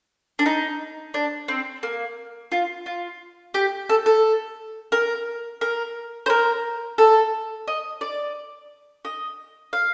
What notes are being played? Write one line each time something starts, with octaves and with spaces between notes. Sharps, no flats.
D4
D#4
D4
C4
A#3
F4
F4
G4
A4
A4
A#4
A#4
C5
A#4
A4
D#5
D5
D#5
F5